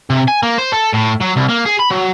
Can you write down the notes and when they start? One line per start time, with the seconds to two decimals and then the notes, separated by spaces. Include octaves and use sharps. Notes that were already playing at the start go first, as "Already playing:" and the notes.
0.10 C3
0.28 G#5
0.43 A#3
0.58 C5
0.72 A4
0.93 A2
1.21 F#3
1.36 C2
1.49 A#3
1.66 G#4
1.79 B5
1.90 F#3